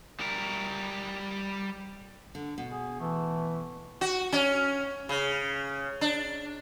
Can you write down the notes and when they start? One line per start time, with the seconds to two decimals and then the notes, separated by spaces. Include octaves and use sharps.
0.20 G3 A#4
2.35 D3
2.58 B2
2.72 G#4
3.00 E3 A3
4.01 F#4
4.32 C#4
5.09 C#3
6.01 D4